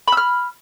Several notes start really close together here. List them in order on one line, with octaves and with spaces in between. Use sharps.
B5 E6 F6